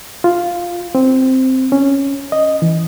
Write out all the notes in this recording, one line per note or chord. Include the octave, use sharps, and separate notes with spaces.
F4
C4
C#4
D#5
E3